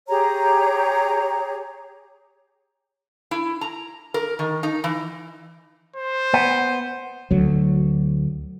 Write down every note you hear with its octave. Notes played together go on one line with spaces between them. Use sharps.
G4 G#4 C#5 A#5
E4
A#5
A#4
D#3
D#4
E3
C5
B3
D2 F#3